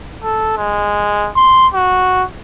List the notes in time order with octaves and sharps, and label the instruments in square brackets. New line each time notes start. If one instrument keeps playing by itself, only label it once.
[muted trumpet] A4
G#3
C6
F#4